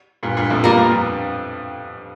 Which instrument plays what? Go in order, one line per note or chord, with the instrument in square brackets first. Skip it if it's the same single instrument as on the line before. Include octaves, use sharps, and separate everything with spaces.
[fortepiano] G2 A#2
G2 A#2
F2 A2
[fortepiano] G2 [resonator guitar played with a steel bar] G3 A#3 F4 A#4
[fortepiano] F2
G2